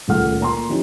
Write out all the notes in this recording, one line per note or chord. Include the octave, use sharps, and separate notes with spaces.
D#1 C#2 A3 F#5 F6
A#2 A#5 C6
F3 B3 C#4 D#4 E4 G4